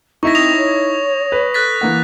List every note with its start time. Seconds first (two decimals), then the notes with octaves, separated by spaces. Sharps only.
0.23 C4 D#4 E4 C#6 A#6
0.35 C4 D#6 A#6 F7
0.56 C#5
1.32 B4
1.54 A4 F#6 A6 B6
1.81 E3 A#3 F#5